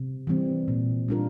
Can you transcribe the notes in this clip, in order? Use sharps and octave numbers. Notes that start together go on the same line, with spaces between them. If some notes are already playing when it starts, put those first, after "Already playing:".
Already playing: C3
E3 G3 C4
A#2
G3 D4 F4 A#4